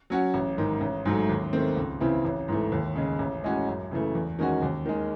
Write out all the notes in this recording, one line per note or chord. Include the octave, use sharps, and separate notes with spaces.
F#3 C#4 F#4
A1
G#2 D#3
A1
G#2 F#3 A3
D#2
D#3 A3 C4
C#2
C#3 E3 C4 E4
A1
G#2 E3 A3
D#2
C#3 G#3
A1
A2 G#3 C#4 F#4
F#2
C#3 E3 A3
E2
D#3 G#3 C#4 F#4
D#2
D#3 G#3